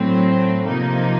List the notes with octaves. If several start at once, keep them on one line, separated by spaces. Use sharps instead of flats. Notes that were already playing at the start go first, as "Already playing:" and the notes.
Already playing: A2 F#3 A3 C4
C3 F3 A#3 D#4